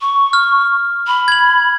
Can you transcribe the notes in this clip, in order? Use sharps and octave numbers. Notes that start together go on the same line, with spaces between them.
C#6
F6
B5
G#6 F#7